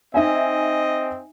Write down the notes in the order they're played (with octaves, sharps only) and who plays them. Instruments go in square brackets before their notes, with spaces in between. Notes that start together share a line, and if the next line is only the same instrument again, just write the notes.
[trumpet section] C4 D#5 [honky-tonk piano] D#4 E5 G#5